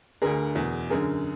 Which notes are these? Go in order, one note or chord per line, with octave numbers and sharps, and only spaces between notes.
D2 D3 G#4 A#4
E2 B2
F#2 D3 G#4 A#4